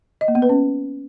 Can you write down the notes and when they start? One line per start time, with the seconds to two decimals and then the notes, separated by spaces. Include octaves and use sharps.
0.21 D#5
0.28 A#3
0.35 B3
0.42 B4
0.49 C#4